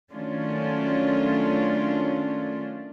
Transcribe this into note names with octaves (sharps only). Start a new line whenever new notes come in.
D#3 F#3 A3 C#4 D4 F4